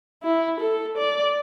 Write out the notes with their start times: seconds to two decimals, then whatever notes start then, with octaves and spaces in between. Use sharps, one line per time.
0.23 E4
0.60 A4
0.97 D5